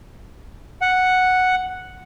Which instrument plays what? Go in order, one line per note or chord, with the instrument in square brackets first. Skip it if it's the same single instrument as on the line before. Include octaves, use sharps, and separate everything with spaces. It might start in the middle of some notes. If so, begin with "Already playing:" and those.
[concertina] F#5